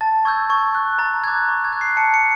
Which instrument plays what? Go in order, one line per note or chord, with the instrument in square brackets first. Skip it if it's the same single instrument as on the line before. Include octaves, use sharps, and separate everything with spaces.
[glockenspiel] A5 A6
C#6 E6 G6 G#6
C#6 G#6
F#6
A#5 A6
D6 F#6 G#6
C#6
G#6
F#6
C7
A5 C#7
C#7